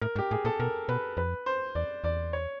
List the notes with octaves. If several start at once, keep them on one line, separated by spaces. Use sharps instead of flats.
A2 A#4
G#2
G4
A2 G#4
A#2 A4
B2 A#4
B2 B4
F2 B4
C5
E2 D5
E2 D5
C#5